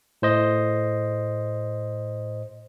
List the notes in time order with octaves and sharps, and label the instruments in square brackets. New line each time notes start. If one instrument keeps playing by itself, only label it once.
[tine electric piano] A2 C5 D#5